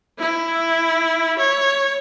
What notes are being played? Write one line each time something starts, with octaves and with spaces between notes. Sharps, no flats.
E4
C#5